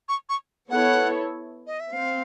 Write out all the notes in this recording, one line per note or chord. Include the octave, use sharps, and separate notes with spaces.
C#6
C#6
B3 E4 A4 C#5 F#5
D#5
E5
C4 F5